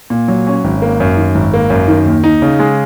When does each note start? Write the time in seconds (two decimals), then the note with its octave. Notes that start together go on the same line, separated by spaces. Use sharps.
0.10 A#2
0.28 F#3
0.47 C#4
0.64 G#1
0.82 A#3
1.00 F#2
1.17 D#3
1.35 G#1
1.54 A#3
1.70 F#2
1.88 D#3
2.06 D#2
2.24 D#4
2.42 C#3
2.59 G#3